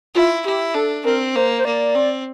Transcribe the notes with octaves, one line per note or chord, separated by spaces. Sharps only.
E4 F4
E4 G4
D4 A4
C4 A#4
A#3 C5
C5
A#3 D5
C4